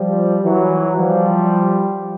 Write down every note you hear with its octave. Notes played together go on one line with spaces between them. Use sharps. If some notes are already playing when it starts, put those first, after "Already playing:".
Already playing: F3 G3
E3 F#3
F3 G3